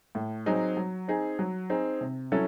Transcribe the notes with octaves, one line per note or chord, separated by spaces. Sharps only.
A2
F#3 C4 D#4 G#4
F#3
C4 D#4 G#4
F#3
C4 D#4 G#4
C3
F#3 C#4 E4 A4